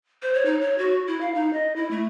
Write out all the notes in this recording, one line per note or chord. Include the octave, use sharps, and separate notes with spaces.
C5
C#5
D#4
C#5
F#4
E4
F5
D#4
D#5
E4
A3